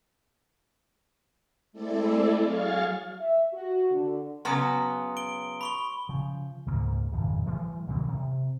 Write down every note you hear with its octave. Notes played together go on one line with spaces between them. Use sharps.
G#3 A3 C4 E4 A4 D5
F#3 G#4 F5 C#6 F6 A6
E5
F#4
D3
C#3 F#3 B3 C6 D#6
D7 G7
B5 C#6 G7
C#3 F3
C#2 G#2 A#3
D#1 G#1 F2 C#3
E3 G3 A3
G2 A#2 D#3 F3
C3